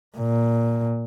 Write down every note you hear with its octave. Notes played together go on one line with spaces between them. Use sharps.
A#2